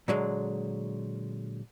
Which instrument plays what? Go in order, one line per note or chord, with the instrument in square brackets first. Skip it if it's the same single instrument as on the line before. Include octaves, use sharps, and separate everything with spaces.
[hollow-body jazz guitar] A#2 D3 F#3 G#3